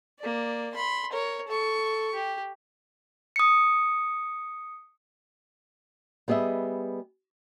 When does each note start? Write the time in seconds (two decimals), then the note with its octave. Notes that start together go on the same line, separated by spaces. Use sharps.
0.19 A#3 D5
0.74 B5 C6
1.12 A#4 C#5
1.47 A4 C#6
2.14 G4
3.36 D#6 C#7
6.28 G3 B3 G#4 D#5 E5